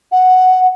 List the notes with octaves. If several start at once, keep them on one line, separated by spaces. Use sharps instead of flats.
F#5